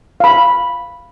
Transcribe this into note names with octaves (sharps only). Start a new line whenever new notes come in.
F5 B5